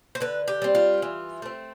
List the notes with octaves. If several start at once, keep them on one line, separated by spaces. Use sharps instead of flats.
C5
D3 B4
G4
G3 C4
F4
E3
A3 C4